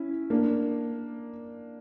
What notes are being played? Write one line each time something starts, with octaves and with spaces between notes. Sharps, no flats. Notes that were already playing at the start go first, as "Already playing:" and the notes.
Already playing: C#4 E4
A#3 D4